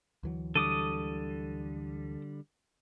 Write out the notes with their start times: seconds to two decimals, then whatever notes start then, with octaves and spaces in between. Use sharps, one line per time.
0.23 D2 E3 F#3
0.55 D3 G3 A4 D6 D#6 D#7